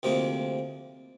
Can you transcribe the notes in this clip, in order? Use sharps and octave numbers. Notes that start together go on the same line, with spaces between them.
D2 C3 F3 A#3 D#4